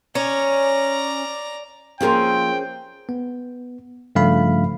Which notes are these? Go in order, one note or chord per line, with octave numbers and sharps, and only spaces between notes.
C#4 D5 A#5
F3 A#3 C4 C#4 G#4 A#4 G5
B3
G2 C#3 F3 A3 F5 B5